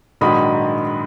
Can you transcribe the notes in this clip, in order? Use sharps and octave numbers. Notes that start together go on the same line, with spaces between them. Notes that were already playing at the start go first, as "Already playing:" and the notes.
A#1 G#2 D#3 F#3 B5 D#6